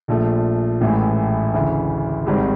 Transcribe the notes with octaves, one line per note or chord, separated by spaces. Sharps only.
A#1 A#2 F3 A3
A1 A2 E3 G#3
D2 C#3 E3
G#1 G#2 D#3 G3 C4